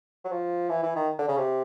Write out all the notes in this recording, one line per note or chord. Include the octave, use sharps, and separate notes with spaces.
F#3
F3
E3
E3
D#3
D3
C#3
C3